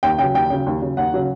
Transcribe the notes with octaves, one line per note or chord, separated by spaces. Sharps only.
D#2 G5
C#3 F#3 G5
D#2 G5
C#3 F#3
D#2
C#3 F#3
D#2 F#5
C#3 F#3